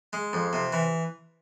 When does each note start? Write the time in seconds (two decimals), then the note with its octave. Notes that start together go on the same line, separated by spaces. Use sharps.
0.13 G#3
0.33 F2
0.53 C3
0.73 E3